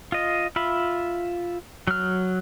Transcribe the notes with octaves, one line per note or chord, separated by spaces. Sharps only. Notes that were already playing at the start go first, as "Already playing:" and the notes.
F4 D#5
F4 E5 B5
F#3 F6